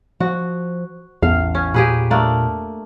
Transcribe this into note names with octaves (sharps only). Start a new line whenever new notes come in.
F3 F#4
A1 E2 A2 F5
C#4
A#2 G4 G#4 B4
A3 A#3 D4